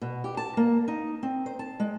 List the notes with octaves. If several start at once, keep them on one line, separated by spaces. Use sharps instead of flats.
B2
G4
A5
A#3
D#4
C4
C5
A5
G#3